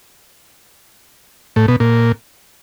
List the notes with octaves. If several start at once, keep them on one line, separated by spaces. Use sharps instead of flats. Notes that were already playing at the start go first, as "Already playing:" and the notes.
A2
B2
A#2